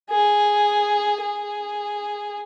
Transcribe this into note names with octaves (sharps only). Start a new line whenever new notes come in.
G#4
G#4